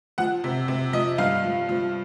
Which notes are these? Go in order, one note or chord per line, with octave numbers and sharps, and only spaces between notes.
F3 F#5
C3
C3
F3 D#5
G2 F5
F3
F3